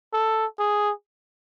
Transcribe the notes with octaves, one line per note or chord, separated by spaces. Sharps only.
A4
G#4